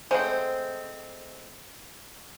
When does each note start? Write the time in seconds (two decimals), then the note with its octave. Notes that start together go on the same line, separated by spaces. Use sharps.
0.11 G#3 A3 C4 C5 F#5